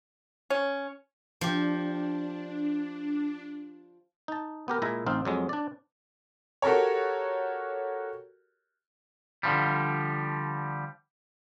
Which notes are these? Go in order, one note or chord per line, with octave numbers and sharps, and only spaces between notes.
C#4
F3 D4 G4
D#4 A5
B3 G4 A#4
A#2 G#3 E4 E5 G#5 A#5
A1 C4 D#4 F5
F2 F#3 G#3
D4 D5
F#4 G4 A4 A#4 C#5
D3 F3 G3